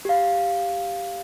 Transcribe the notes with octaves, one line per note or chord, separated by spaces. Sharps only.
G4 F5